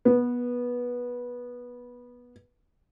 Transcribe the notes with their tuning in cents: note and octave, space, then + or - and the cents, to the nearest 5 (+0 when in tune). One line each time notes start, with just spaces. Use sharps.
B3 -15